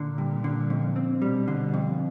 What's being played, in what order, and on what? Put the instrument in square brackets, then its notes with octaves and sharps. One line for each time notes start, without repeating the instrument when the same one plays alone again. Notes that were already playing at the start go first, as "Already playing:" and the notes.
Already playing: [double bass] A#2 [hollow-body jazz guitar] D3
[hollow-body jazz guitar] G2
D3
F2
C4
[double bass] B2 [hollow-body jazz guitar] G3
[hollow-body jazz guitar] D3
F2